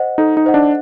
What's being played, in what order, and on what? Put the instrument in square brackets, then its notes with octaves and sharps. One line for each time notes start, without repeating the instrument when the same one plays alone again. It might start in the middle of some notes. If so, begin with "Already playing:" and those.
Already playing: [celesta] C5 D#5 F#5
[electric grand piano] D#4 [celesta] A4
[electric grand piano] D#4
[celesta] C5 D#5 F#5
[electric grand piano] D4